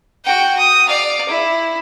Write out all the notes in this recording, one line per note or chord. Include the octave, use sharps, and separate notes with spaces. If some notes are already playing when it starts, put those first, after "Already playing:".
F#4 G5
D#6
D5 F5
E4